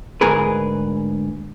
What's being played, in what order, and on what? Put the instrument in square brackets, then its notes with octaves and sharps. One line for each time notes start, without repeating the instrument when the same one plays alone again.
[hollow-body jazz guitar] D2 G#2 G#4 A#4 B4